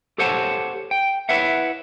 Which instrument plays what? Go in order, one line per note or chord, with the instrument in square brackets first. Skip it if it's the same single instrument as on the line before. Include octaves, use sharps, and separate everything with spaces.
[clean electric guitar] G4 A4 C5 C#5 F#5 A5
G5
E4 B4 C#5 E5 F#5